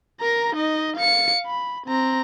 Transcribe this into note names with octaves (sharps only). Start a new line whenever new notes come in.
A#4 A#5
D#4 D#5
F5 C#7
B5
C4 A#5